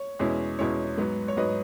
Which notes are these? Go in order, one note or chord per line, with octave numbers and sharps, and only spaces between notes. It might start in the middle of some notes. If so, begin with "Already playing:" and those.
Already playing: C#5
E2 B2 G#3 C#4 E4
E2 B2 G#3 C#4 E4 C#5
G#2 F#3 B3
C#5
G#2 F#3 B3 B4 D#5